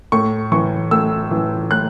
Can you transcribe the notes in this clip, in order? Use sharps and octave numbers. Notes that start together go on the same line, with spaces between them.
A2 C#6
E3 C#6
A2 E6
E3
A2 F#6